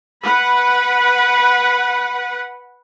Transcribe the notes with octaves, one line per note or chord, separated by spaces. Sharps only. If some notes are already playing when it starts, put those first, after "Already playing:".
B4 F#5 B5